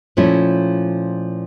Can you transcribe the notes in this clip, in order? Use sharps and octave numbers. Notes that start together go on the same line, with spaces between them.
A#2 F3 A3 C#4 E4